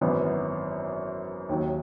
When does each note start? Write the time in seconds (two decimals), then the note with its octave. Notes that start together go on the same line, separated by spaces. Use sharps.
0.01 G#1 F#2 E3 B3
1.49 D#2 D#3 F#3